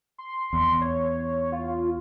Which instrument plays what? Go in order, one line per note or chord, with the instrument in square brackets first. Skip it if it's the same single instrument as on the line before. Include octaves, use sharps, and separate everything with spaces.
[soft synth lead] C6
[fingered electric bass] E2
[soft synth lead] C#5
F4